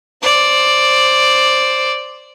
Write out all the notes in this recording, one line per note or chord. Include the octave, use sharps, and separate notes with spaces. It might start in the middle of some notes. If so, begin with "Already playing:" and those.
C5 D5